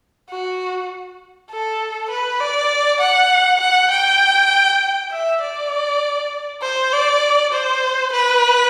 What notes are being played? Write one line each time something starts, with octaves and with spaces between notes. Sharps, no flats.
F#4
A4
B4
D5
F#5
F#5
G5
E5
D5
C5
D5
C5
B4